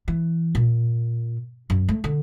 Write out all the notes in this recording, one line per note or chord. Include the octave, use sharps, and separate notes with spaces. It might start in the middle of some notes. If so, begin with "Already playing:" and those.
E3
A#2
F#2
A3
D3